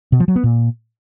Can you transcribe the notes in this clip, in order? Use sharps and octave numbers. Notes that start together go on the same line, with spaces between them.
B2
F3
F#3
B3
A#2